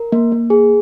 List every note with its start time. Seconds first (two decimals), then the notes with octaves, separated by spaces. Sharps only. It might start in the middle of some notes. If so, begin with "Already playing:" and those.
Already playing: A#4
0.12 A#3
0.32 A#3
0.50 G#4